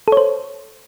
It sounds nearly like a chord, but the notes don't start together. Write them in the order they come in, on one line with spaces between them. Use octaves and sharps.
A4 C#5 C5